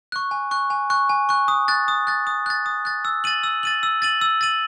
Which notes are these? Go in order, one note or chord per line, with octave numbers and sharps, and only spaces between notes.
C#6 F#6
G#5
C#6 F#6
G#5
C#6 F#6
G#5
C#6 F#6
D#6
F#6 A6
D#6
F#6 A6
D#6
F#6 A6
D#6
F#6 A6
E6
A6 D#7 F#7
E6
A6 D#7 F#7
E6
A6 D#7 F#7
E6
A6 D#7 F#7